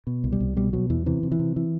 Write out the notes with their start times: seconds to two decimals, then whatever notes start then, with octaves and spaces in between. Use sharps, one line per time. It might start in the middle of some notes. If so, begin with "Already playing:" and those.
0.07 B2
0.24 C2
0.32 G3
0.40 C2
0.57 B2 G3
0.73 B2 F#3
0.90 E2 E3
1.06 C3 E3
1.23 C3
1.32 E3
1.39 C3
1.56 E3